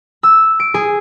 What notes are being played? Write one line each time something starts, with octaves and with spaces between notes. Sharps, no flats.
E6
D7
G#4